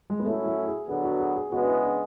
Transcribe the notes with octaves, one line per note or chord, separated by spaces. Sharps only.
G#3
B3
A2 F#3 A3 C#4 E4
A3
G#4
D3 F#3 B3 G#4
F#4
G#4
G#4
C#3 G#3 B3 F#4
D4
E4
D4